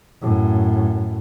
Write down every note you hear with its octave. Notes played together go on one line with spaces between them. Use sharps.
F#2 A2